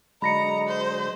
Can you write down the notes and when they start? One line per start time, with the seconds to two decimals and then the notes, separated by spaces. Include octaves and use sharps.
0.22 D3 F#3 G#3 D#5 A#5 B5 A#6 C#7
0.67 C5